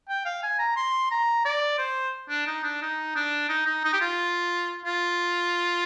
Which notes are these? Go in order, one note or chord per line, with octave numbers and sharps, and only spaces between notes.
G5
F5
G#5
A#5
C6
A#5
D5
C5
D4
D#4
D4
D#4
D4
D#4
D#4
D#4
G4
F4
F4